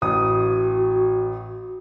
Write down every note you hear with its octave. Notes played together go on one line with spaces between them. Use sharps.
A1 F#4 D#6